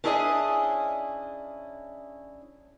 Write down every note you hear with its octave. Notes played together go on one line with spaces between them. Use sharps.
C#4 D4 E4 G#4 B4 D#5